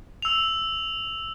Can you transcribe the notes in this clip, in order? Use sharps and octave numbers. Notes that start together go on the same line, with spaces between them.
E6 F7